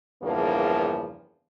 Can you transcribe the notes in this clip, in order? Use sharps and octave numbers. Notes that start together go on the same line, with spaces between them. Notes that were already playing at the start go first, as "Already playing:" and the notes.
E2 G2 C#3 F3 A#3